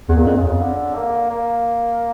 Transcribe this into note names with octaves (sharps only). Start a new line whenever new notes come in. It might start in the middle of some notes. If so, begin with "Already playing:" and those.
E2
A#2
F2
C#3
D3
A#3
A#3